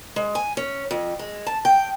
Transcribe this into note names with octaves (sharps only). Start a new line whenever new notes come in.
G#3
G#5
C#4
F2
G#3
A5
G5